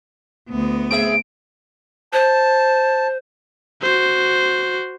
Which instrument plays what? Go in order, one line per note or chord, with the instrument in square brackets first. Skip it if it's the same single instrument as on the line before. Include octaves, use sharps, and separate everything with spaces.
[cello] D2 B3
[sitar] C4 G#4 E5 [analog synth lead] D7
[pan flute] C5 [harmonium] A5
[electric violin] F#4 C5